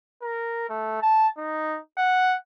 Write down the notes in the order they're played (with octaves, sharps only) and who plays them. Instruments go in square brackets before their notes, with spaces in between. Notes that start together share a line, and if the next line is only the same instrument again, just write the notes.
[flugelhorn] A#4
A3
A5
D#4
F#5